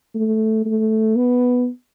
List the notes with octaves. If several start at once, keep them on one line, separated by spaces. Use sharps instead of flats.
A3
A3
B3